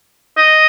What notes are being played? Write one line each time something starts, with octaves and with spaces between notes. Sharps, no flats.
D#5